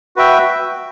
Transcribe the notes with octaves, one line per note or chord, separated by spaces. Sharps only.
F#4 B4 E5 G5